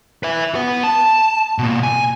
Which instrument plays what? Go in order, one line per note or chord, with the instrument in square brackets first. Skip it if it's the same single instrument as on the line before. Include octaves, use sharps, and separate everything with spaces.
[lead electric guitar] B4 E5
B3 B4
A5
B2 A#3
G#5